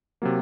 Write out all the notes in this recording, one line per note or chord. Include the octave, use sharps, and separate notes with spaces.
C3 F#3 A#3